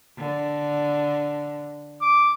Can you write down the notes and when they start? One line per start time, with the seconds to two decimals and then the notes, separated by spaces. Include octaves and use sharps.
0.18 D3
2.02 D6